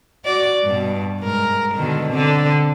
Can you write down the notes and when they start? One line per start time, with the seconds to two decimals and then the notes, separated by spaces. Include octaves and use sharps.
0.25 F#4 D5
0.64 G2 B2
1.21 G#2 A#4
1.75 B2 D3 D#3
2.11 D3 C4